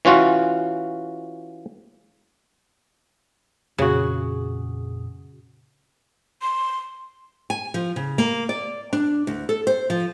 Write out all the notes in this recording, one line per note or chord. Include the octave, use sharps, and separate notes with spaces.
E3 C#4 F4 F#4
F2 A#2 C#3 F#4 G#4 D#6
C6
G#5
F3
C#3
A#3
D5
D4
D2
A4
C5
F3